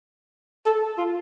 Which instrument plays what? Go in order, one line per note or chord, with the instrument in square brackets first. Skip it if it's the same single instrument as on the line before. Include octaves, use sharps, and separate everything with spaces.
[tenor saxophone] A4
F4